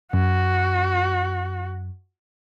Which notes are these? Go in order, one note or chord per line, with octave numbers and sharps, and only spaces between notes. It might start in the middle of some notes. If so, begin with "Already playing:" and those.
F#2 F#4